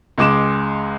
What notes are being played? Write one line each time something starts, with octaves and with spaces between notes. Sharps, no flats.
C#2 G#3 D6 E7